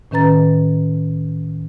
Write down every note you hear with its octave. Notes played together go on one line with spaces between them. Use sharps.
A2 D#3 C#4 B4 A#5 A6